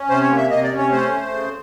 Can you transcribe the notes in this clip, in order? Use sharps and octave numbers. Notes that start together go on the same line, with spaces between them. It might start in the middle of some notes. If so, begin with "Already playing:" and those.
Already playing: C#4
C3 C5
C#5
A#3
E5
C3 D#5
D5
C#4
C#5
A3 C5
A3
C#3